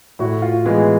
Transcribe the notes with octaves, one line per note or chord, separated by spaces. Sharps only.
A2 E4 F#4
F4
E3 G#3 B3